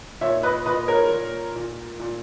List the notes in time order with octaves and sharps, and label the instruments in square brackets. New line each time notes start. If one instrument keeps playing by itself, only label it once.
[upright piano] A#2 C#5 E5
B4 D#5
A#2 B4 D#5
A#4 C#5
A#2
A#2
A#2